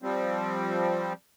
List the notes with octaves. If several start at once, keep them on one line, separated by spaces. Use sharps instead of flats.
F3 G3 C4